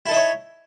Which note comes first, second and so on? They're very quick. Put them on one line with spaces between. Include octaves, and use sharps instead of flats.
E4 A4 D#4 E5 C#5